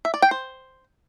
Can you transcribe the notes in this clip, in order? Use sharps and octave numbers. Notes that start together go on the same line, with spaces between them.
E5
D5
G5
C5